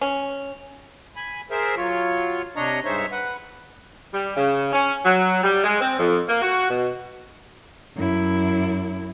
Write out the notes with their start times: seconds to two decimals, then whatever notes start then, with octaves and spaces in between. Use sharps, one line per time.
0.01 C#4
1.16 G#5 B5
1.51 G#4 A#4 C5 E5
1.77 F#3 F4 C#5
2.56 C3 D4 C#5 D#5 A#5
2.85 G2 G#3 D#4 C5 C#5 E5
3.12 B4 F#5
4.12 G3
4.36 C#3
4.73 C#4
5.04 F#3
5.43 G3
5.64 G#3
5.80 C4
5.99 F2
6.28 A#3
6.41 F#4
6.69 B2
7.96 F#2 E4